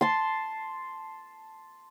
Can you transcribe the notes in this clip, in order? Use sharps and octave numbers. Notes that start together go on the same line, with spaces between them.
A5 C6